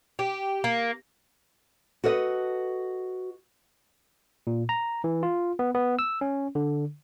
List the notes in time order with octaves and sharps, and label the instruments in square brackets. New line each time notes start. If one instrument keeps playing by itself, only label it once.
[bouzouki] G4
A#3
[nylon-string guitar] F#4 A4 B4 D#5
[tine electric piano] A#2
A#5
E3
F4
B3
B3
E6
C#4
D3